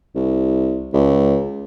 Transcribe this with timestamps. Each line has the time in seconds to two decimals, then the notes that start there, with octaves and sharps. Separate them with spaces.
0.15 C2
0.93 C#2